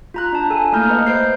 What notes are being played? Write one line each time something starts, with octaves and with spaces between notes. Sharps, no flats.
F4 A#5 F#6
D4 A5
A4 G#5
A3 A#3 E4 A#5 F6 G6
B4 D#5
C5 G6 C7